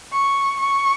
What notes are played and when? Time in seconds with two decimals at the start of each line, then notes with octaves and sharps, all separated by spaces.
0.13 C#6
0.60 C#6